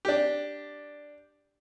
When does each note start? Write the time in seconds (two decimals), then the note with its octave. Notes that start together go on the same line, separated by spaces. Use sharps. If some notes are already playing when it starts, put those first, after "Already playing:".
0.05 D4 G4